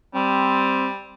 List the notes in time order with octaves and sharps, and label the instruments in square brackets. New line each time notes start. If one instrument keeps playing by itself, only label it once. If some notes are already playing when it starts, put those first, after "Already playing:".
[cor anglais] G3 [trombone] C4